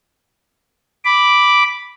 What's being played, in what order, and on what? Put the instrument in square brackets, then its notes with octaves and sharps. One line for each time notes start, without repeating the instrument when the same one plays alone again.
[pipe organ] B5 D6